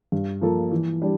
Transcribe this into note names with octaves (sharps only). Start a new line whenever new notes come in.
G2
F3 A#3 F4 A4
E3
G3 D4